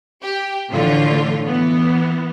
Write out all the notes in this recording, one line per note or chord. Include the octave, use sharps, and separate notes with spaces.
G4
A2 D3 E3 F3 A3 F4
E3 B3